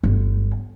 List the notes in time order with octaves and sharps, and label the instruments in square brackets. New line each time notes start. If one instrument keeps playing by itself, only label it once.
[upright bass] G1